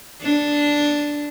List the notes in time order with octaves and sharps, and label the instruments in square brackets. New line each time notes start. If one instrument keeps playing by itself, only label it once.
[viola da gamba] D4